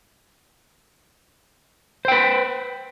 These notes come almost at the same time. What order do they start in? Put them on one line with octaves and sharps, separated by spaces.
C5 G5 B4